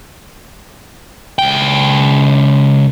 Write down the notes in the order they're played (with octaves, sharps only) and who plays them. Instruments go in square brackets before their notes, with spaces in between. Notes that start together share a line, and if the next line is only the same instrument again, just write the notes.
[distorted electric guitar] C#2 G5